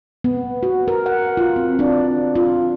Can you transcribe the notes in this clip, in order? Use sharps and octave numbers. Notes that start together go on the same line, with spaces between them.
B3
F#4
A#4
F#5
F4
C4
D4
F4